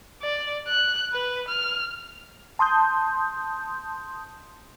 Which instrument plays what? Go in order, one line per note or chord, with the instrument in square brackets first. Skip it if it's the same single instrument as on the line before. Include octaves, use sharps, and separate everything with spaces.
[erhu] D5
F#6
B4
F6
[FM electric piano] A5 C6 D#6 G6